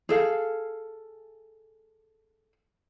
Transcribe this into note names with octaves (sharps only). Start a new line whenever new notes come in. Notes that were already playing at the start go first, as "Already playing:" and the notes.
G#4 A4 F5